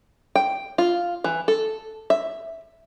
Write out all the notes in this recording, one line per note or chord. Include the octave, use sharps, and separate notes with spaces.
G5
F4
E3
A4
E5